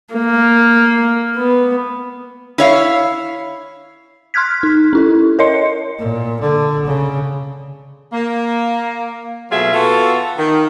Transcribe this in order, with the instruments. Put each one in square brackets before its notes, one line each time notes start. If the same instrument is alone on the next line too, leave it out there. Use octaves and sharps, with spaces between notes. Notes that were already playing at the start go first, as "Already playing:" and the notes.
[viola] A#3
B3
[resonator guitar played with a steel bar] E4 C#5 F5
[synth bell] C6 F6 F#6 G#6 B6
D#4
C#4 E4 A4
A#4 C#5 D#5 C6 C#7
[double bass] A#2
D3
C#3
[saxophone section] A#3
B2 F#3 A3 F4 G#4 E5
B3 F4 F#4 A4
D#3